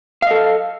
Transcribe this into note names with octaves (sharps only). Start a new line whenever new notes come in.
A4 D#5 F5